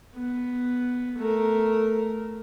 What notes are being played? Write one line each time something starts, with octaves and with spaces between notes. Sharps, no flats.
B3
A3 A#4